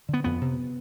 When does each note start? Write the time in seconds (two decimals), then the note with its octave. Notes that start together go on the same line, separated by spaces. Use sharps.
0.09 D3 B3
0.24 F2 B3
0.41 C3